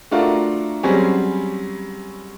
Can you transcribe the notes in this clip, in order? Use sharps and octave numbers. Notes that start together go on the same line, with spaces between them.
A3 D4 F4 F#4 A#4
F#3 G3 C4 C#4 G#4